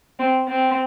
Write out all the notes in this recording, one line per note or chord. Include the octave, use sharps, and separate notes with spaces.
C4
C4